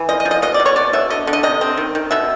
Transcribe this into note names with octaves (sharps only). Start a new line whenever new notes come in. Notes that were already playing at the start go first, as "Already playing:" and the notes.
Already playing: E3
F3 D#5
D#5
F3
D#5
B2 D#5
D5
B2
C#5
B2 D5
B2 E5
D3 D#5
D3
D#5
C3 D#5
C4
D#3
D#3
B2 E5